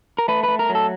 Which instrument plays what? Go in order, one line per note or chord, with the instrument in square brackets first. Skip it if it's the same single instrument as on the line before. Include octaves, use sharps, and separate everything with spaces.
[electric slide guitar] A#4
A3 B4
A3 B4
A#4
F#3
A4